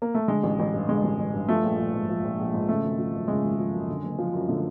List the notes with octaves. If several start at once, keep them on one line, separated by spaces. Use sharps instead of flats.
A#3
A3
D3 G#3
A1
A1
G2
D3 G#3
A1
A1
G2
F3 A3
A#1
A#1
G#2
F3
A#1
A#1
G#2
C#3 A3
G#1
F3
F#2
C#3 G#3
G#1
F3
F#2
D3
F#1
F3
F#2
D3 A3